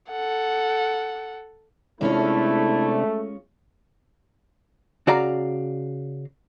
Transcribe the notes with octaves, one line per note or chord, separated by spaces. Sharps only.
A4 F#5
C3 G#3 A3 C#4 D4 E4 F4
C#3 F#4 D5 F5 A#5